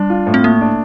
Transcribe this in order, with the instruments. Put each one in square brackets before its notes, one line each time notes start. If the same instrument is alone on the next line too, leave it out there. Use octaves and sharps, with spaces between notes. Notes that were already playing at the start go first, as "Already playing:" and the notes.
Already playing: [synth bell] G3 [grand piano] D4
[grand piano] F4
A2
[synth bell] C4
[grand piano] A3 [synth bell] A#3
[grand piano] D4